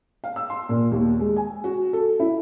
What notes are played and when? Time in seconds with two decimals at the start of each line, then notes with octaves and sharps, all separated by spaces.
0.24 F5
0.36 E6
0.50 C6
0.69 A#2
0.92 D#2
1.20 G#3
1.36 G#5
1.64 F#4
1.93 A4
2.20 E4